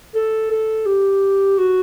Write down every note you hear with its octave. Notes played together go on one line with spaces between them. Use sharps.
A4
A4
G4
F#4